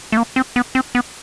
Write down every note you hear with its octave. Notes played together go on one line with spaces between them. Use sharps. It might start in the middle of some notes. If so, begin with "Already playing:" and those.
A3
A#3
C4
B3
C4
B3